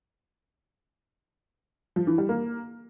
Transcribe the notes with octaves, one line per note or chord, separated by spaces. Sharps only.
F3
E3
G3
A#3